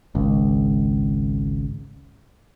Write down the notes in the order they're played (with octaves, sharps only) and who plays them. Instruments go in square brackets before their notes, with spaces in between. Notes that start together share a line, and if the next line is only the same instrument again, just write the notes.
[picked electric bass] G#1 C#2